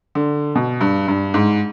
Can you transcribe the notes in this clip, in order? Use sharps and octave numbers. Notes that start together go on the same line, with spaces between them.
D3
B2
G2
G2
G#2